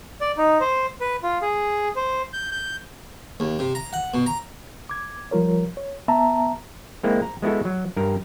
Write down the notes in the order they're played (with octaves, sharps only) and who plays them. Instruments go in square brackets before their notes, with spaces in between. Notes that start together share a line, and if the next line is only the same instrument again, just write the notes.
[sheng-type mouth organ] D5
D#4
C5
B4
F4
G#4
C5
G6
G6
[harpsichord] D#2
C3
A#5
F#5
B2
A#5
[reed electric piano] D6 G#6
F3 G3 F4 A#4 C#5
C#5
B3 E5 A5 A#5
[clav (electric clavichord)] G#3 A#3 C4 E4
A#5
G#3 B3 E4 F#4 A4
F#3
G2 A#4